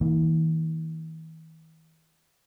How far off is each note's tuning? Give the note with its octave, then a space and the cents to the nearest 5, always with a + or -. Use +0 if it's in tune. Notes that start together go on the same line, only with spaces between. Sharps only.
E3 -45 A#3 +0